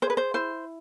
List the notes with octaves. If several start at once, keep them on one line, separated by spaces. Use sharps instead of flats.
G#4 C5
B4
C5
E4 C5